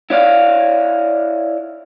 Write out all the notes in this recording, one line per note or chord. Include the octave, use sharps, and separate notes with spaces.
E4 C#5 D5 F5